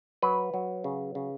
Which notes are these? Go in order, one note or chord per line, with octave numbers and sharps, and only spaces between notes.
F#3 B4
F#3
C#3
C#3